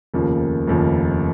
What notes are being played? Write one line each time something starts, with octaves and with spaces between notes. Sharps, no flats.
F1 D#2 C#3 F3 A#3
F1 D#2 C#3 F3 A#3